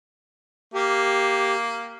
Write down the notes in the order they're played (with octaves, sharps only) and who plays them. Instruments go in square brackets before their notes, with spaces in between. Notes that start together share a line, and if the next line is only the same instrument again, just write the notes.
[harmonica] A#3 [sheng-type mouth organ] G4